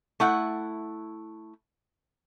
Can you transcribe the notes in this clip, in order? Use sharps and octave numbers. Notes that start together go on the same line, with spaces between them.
A3 E4 F#5